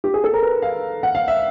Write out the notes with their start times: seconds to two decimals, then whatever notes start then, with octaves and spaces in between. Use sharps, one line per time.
0.04 G4
0.14 G#4
0.24 A4
0.34 A#4
0.42 B4
0.62 F5
1.03 F#5
1.15 F5
1.28 E5